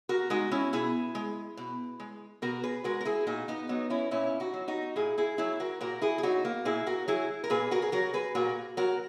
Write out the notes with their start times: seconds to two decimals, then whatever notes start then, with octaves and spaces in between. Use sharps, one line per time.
0.09 F#4 A#4
0.30 G#3 D#4 F#4
0.51 C#4 E4
0.73 B2 E4 G#4
1.15 G#3
1.57 B2
2.00 G#3
2.42 B2 F#4 A#4
2.63 G#4 B4
2.84 G#3 F#4 A#4
3.01 A#4
3.05 E4 G#4
3.27 A#2 D#4 F#4
3.48 B3 D#4
3.69 F#3 B3 D#4
3.90 C#4 E4
4.11 A#2 C#4 E4
4.40 D#4 F#4
4.53 F#3
4.68 D#4 F#4
4.96 A#2 E4 G#4
5.18 E4 G#4
5.38 F#3 E4 G#4
5.60 F#4 A#4
5.81 A#2 F#4 A#4
6.02 E4 G#4
6.18 G#4
6.23 F#3 D#4 F#4
6.45 A#3
6.65 A#2 E4 G#4
6.86 F#4 A#4
7.08 F#3 E4 G#4
7.44 A#4
7.50 A#2 G#4 B4
7.71 F#4 A#4
7.82 G#4
7.92 F#3 F#4 A#4
8.14 G#4 B4
8.35 A#2 F#4 A#4
8.77 F#3 F#4 A#4